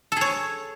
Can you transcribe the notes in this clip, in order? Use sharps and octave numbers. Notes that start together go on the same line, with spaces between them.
G#4 A4 C#5